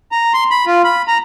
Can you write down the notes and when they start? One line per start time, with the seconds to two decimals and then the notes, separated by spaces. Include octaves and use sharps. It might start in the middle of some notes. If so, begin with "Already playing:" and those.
0.12 A#5
0.34 C6
0.51 B5
0.66 F4
0.84 B5
1.08 A#5